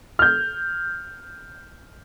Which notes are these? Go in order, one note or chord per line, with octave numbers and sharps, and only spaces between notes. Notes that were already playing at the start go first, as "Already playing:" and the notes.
F6 G6